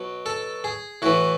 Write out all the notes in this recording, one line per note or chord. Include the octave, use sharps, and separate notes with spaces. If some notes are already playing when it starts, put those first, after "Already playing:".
Already playing: B2 F#3
A4
G#4
A2 E3 F#4